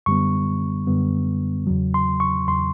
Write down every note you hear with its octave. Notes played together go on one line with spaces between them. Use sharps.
F#2 D3 G3 B3 C#6
F#2 D3 G3 B3
E2 C#3 F#3
C6
C#6
E2 C#3 F#3 C6